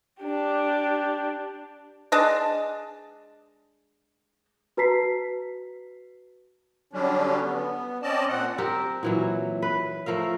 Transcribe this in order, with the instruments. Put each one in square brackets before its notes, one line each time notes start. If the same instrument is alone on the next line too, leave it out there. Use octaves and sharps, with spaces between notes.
[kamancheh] D4 G4
[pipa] G#3 D4 D#5 A5
[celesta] F#4 B4 A5 A#5 B6 C7
[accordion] D3 F#3 G3 C#4 D4
B3
C4 C#4 D5 D#5 A5
A#2 C4 F#5
[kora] C4 G4 A#4
A#2 E3 F#3
B4
F3 A3 A#4 F5